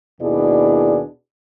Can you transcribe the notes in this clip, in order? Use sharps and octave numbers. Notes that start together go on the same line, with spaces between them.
D#2 B2 D4 E4 G#4 D5